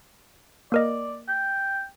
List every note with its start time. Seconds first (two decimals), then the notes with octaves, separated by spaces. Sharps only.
0.72 A#3 A#4 D5 D#5
1.28 G5